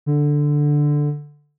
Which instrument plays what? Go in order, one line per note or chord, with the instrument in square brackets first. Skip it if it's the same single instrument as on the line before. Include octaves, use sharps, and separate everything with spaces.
[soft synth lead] D3